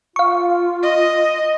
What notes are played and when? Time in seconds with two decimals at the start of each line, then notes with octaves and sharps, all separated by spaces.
0.16 F4 F5 C#6
0.83 D#5